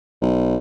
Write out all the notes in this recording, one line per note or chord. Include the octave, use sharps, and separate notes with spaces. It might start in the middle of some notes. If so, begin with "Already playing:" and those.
B1